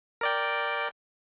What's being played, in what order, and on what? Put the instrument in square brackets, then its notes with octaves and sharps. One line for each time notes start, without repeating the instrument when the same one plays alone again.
[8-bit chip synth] A#4 D5 G5